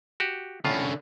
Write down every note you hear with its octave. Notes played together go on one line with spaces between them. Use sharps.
F#4 G4
A2 D3 C#4 F4